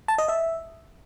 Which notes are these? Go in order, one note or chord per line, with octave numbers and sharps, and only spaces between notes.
A5
D#5
E5